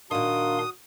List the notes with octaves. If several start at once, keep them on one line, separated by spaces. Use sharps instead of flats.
A#2 D#3 D4 F#4 F5 C6 D#6